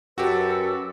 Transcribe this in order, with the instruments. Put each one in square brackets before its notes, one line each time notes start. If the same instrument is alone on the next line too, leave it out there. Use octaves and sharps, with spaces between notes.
[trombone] F#2 [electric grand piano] F#4 G4 [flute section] A4 B4 [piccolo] E6